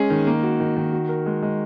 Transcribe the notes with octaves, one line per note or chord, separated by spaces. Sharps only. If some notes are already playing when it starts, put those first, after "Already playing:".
Already playing: G#3 C#4 G#4
D#3
A#3
F#4
D#3
D#3
F#4
A#4
G#3
G#3